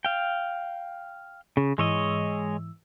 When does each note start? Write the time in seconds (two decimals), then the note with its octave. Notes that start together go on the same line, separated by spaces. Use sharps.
0.05 F5 G5
1.57 C#3
1.78 G#2 E3 G#3 C#5 D#5 E6